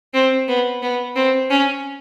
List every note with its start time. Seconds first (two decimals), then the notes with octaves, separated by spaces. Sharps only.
0.14 C4
0.48 B3
0.82 B3
1.16 C4
1.51 C#4